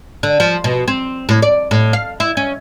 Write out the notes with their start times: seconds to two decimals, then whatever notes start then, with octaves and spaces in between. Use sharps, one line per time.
0.23 D3
0.40 F3
0.64 B2
0.88 C4
1.29 A2
1.42 D5
1.71 A2
1.93 F5
2.20 E4
2.37 C#4